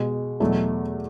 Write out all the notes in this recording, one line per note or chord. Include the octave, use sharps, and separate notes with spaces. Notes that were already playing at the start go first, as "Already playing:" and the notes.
Already playing: B2 G#3
E2 B2 F#3 A3